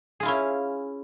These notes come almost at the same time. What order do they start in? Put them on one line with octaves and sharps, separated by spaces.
G#4 F4 E4 C#4